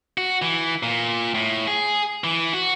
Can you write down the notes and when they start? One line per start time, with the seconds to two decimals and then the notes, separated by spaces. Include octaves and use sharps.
0.18 F#4
0.42 E3
0.83 A#2
1.34 A2
1.67 G#4
2.24 E3
2.54 F#4